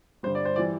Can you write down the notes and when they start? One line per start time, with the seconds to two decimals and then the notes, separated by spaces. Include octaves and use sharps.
0.23 G2 D3 G3 C5
0.35 D5
0.45 C5
0.56 E3 G3 D5